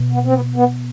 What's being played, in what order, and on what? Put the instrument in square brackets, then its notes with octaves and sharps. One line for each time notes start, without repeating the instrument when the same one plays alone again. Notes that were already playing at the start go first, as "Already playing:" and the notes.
Already playing: [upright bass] B2
[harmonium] B3
C4
B3
B3